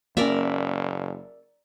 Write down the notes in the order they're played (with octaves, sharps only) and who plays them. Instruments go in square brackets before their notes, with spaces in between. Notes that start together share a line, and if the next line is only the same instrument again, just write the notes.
[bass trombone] F#1 [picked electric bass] A#3 C#4 [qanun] A#4 D5 E5